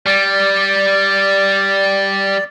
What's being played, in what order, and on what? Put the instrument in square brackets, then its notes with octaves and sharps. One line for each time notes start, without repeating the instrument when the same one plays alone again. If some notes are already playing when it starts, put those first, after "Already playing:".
[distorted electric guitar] G3 [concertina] D5